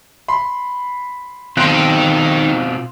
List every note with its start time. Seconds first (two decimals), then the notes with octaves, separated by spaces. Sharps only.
0.28 B5 C6
1.57 B2 D#3 C4 F4 G5 C6 F#6